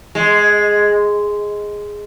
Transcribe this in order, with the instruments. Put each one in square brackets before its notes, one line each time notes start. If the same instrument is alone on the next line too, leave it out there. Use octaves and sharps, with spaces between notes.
[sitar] G#3